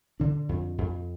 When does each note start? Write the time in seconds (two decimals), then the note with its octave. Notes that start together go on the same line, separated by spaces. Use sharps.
0.20 D3 D4
0.49 F2
0.78 F2